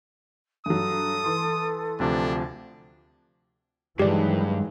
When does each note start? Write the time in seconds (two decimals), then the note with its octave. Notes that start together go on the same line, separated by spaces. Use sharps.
0.66 G2 F#3 A4 D#6
1.24 E3 C6
2.00 D2 C3 F3 D4
3.99 G2 D#3 E3 F#3 G#3 G4 D5